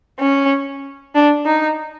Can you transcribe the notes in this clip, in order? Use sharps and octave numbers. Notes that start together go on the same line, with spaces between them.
C#4
D4
D#4